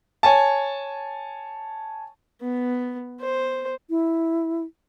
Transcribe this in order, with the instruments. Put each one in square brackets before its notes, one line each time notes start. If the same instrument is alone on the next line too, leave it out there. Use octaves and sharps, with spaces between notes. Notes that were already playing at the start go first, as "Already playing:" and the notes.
[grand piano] C#5 G#5 A5
[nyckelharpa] B3
C5
[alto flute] E4